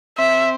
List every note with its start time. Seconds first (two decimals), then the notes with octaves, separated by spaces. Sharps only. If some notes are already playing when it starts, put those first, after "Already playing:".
0.18 C4 E5